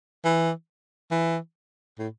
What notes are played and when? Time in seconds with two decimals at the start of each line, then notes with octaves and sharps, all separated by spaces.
0.25 E3
1.11 E3
1.99 A2